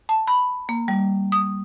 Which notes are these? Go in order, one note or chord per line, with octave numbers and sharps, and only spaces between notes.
A5
B5
A#3
G3
D#6